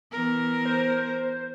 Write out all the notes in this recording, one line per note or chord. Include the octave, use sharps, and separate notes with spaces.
E3 B3 A#4
C5